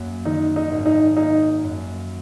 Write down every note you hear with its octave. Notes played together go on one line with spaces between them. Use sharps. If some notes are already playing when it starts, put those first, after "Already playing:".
Already playing: F#2 A#3
D#3 D#4
D#4
G#1
D#4
A#3 D#4
F#2